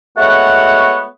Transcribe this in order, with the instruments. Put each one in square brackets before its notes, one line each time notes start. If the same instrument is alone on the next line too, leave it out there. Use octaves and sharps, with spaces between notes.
[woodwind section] G#3 A3 B3 F#4 C#5 F#5